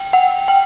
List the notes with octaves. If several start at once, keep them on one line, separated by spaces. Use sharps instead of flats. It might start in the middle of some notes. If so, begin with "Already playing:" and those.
Already playing: G5
F#5
G5